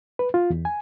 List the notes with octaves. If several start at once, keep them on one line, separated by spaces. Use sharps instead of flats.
B4
F4
E2
G#5